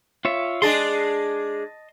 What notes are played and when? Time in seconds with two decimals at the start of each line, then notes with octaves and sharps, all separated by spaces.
0.25 F4 C#5 E5
0.62 G#3 D4 G#4 D#5 A5 C6